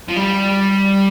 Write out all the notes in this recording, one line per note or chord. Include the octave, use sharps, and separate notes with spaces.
F3
G3